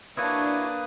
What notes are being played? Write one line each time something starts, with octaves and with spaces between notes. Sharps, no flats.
A#3 D4 E4 F#4 B4 C#5 D#6